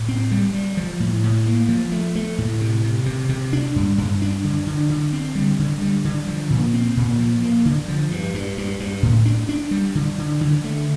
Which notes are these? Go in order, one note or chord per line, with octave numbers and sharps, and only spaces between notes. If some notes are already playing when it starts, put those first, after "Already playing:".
Already playing: A2
C4
G3
G3
F3
A2
A2
A#3
F3
A3
A3
A2
C3
C3
C3
C3
D4
G2
G2
D4
D3
D3
D3
C4
G3
D3
G3
D3
F3
A#2
C4
A#2
F3
A#3
D3
F3
G2
G2
G2
G2
A2
D4
D4
G3
D3
D3
D3
A3